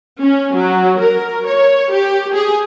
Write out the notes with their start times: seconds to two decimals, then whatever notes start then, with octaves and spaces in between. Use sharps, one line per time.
0.22 C#4
0.54 F#3
1.00 A#4
1.48 C#5
1.92 G4
2.35 G#4